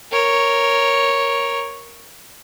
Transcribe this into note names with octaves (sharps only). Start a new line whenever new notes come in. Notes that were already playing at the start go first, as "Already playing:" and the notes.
A#4 C#5